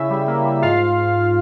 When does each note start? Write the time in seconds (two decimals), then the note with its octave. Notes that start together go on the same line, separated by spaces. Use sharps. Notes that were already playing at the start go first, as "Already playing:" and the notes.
Already playing: C#3 E4 E5
0.10 G3
0.28 A#3
0.45 G3
0.62 G#2 F4 F5